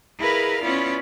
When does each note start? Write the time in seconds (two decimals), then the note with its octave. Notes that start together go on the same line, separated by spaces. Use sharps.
0.19 E4 G#4 A#4 B4 D#5 F5
0.61 B3 C#4 E4 F4 D5